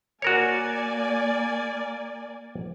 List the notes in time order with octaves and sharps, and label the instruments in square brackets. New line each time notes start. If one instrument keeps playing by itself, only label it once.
[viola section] A#3 D5 G#5 [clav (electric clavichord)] F#4 A#4 C#5